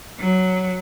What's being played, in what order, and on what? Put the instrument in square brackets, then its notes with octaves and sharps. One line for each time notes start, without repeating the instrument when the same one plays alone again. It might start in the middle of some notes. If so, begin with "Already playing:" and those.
[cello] F#3